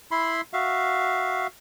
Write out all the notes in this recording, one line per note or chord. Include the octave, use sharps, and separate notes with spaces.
E4 B5 C6
F#4 E5 F5